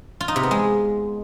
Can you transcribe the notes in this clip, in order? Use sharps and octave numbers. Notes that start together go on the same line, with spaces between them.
F4
D#4
C3
B3
G#3